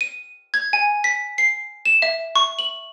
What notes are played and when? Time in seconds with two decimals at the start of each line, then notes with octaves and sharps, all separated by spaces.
0.01 D#7
0.54 G#6
0.73 G#5
1.04 B6
1.38 C7
1.85 E7
2.02 E5
2.35 C#6
2.59 F#7